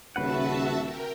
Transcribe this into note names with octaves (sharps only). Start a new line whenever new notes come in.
D#1 C#3 F#4 B4 E5 F#5 A5
A#4 G5